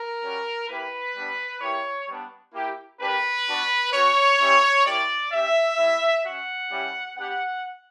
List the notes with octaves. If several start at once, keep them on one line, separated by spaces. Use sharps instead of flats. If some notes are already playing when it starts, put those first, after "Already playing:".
Already playing: A#4
G3 C#4 F#4
A#3 E4 G4 B4
G3 B3 D4
A#3 E4 G4 C#5
G3 B3 D4
A#3 E4 G4
A#3 D4 G4 B4
B3 D4 F#4
C#4 F#4 C#5
G3 C#4 E4 G4
A#3 E4 G4 D5
C#4 G4 E5
G3 B3 E4
C#4 F#4 F#5
G3 C#4 E4 G4
B3 D4 G4 F#5